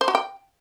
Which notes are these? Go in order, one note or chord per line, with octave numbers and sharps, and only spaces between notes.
C5
F#4
G5